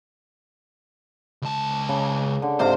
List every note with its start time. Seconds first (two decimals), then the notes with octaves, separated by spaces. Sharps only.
1.42 C#2 A5
1.89 C#3
2.42 D3
2.59 G#2 C3 C5 F5